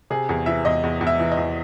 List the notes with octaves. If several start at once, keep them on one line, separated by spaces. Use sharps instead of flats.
C3 G#4
E2 G#4
E3 E5
E2 D#5
E2
E2
E5
E3
D#5
E2